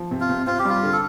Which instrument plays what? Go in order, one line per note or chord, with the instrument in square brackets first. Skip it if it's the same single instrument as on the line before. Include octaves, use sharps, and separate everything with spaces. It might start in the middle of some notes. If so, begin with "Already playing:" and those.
Already playing: [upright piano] F3
C3
[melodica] F4
[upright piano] C3
[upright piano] C4 [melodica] F4
[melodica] G4
[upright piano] G3 [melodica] F4
[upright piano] D3
[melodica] A4